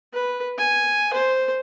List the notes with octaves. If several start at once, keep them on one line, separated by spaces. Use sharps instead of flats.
B4
G#5
C5